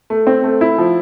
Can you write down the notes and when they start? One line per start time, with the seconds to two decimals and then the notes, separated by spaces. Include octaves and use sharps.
0.10 A3
0.27 C4
0.44 A3
0.61 E4
0.78 F3